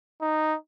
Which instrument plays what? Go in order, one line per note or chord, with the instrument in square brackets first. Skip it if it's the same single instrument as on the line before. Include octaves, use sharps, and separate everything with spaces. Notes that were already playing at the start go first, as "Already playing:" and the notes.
[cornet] D#4